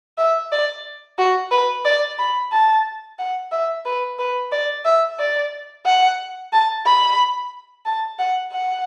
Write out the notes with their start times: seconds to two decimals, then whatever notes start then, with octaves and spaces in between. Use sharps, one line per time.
0.18 E5
0.52 D5
1.18 F#4
1.52 B4
1.85 D5
2.18 B5
2.52 A5
3.19 F#5
3.52 E5
3.86 B4
4.19 B4
4.52 D5
4.85 E5
5.19 D5
5.86 F#5
6.53 A5
6.86 B5
7.86 A5
8.19 F#5
8.52 F#5